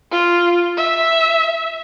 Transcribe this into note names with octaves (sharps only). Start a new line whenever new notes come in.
F4
E5